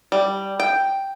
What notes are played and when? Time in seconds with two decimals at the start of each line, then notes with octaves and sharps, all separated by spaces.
0.12 G3
0.60 G5